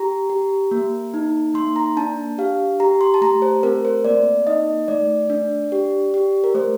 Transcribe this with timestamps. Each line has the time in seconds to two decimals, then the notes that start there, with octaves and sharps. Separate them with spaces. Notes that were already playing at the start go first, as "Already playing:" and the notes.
Already playing: G4 A#5
0.30 G4
0.71 A#3
1.14 D#4
1.54 A#3 C6
1.76 A#5
1.97 D4 A5
2.38 G4 F5
2.80 G4 A#5
3.01 C6
3.14 A5
3.21 A3 A#5
3.42 C5
3.63 C4 A#4
3.85 C5
4.05 A#3 D5
4.47 D#4 D#5
4.88 A3 D5
5.30 D4
5.72 G4
6.14 G4
6.44 A#4
6.54 A3 C5